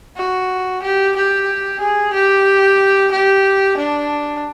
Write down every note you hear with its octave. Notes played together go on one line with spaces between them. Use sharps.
F#4
G4
G4
G#4
G4
G4
D4